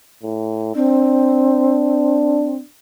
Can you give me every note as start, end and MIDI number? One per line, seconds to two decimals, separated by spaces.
0.23 0.73 45
0.75 2.55 60
0.75 2.67 62